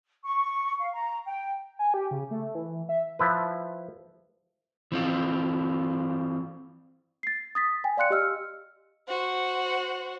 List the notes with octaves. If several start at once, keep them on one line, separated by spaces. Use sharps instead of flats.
C#6
F5
A#5
G5
G#5
G4
C#3
A3
E3
E5
F3 E4 B4
E3 C4 F4
A6 C7
D#6 A6 B6
G5 G#5
D5 F5 C6 F#6 C#7
G4 D#5 E6 F6
F#4 C5